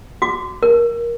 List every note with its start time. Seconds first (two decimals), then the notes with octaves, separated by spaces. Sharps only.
0.22 F#4 D6
0.63 A#4